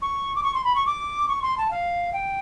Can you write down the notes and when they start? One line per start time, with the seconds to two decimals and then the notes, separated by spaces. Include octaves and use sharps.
0.02 C#6
0.36 D6
0.43 C#6
0.55 C6
0.64 B5
0.75 C#6
0.86 D6
1.29 C#6
1.42 C6
1.58 A5
1.71 F5
2.13 G5